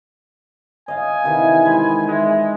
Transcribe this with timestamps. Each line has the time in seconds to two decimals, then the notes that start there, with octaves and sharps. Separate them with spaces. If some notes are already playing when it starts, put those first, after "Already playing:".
0.88 D#5 F5 G#5
1.24 C3 D#3 E3
1.66 G#3 B5
2.07 G#3 E5